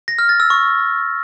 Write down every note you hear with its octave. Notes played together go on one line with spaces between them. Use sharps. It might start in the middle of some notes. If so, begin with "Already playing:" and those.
A#6
F6
A6
E6
C#6